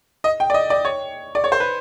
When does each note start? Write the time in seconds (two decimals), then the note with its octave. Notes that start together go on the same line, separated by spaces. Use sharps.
0.24 D#5
0.40 G5
0.50 D5
0.54 D#5
0.70 D5
0.85 C#5
1.35 D5
1.44 C#5
1.52 C5
1.60 B4